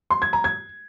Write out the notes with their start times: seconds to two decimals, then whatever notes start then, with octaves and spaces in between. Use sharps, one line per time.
0.10 C6
0.22 G#6
0.33 A#5
0.44 G#6